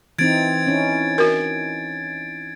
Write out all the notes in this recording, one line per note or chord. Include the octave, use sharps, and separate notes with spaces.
E3 C4 D#4 G#6 A6 D7
C#4 D#4 E4
F#4 A#4